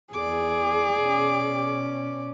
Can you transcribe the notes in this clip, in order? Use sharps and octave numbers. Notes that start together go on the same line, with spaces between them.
E2 G#4 D5 D6
B2 C#4